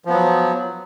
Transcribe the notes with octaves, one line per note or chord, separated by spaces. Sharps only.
F3 F#3 B3